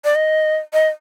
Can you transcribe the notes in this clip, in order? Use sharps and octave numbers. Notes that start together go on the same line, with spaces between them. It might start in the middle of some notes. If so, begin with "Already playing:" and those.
D5
D#5
D#5